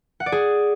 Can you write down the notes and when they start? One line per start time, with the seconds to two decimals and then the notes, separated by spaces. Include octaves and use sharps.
0.20 F#5
0.26 D5
0.32 G#4